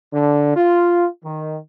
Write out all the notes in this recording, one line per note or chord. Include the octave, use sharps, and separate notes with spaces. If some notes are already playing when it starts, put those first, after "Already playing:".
D3
F4
D#3